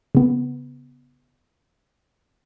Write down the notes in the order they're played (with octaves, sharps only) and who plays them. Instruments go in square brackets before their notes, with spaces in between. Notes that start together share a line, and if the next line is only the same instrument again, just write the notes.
[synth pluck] C#3 B3